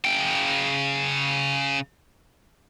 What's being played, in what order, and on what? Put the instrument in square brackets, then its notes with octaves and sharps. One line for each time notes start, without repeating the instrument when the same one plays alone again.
[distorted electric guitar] C#3 G5